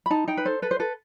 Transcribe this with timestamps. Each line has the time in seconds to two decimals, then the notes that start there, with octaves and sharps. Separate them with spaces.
0.06 B5
0.11 D#4 A5
0.28 D#4 G5
0.37 B4
0.45 A4 C5
0.62 A4 B4
0.71 C5
0.80 A4 B4